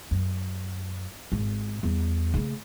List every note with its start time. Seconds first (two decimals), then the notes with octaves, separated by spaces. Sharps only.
0.11 F#2
1.32 G#1
1.83 E2 G3
2.34 C#3 A3